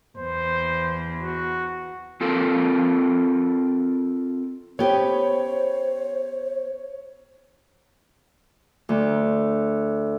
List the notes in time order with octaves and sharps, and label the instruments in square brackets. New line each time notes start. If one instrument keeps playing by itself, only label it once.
[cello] E2 [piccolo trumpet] C5
[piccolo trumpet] F#4
[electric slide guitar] C4 F4 A4 A#4
[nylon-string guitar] B3 C#4 G4 [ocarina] C5 [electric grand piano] C#5
[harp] D2